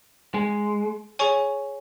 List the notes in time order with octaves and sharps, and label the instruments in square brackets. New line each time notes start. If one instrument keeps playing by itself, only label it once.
[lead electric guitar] G#3
[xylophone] G#4 C#5 G#5 C#6